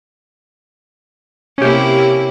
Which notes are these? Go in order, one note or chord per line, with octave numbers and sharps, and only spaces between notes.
C3 A#3 C#4 E4 G4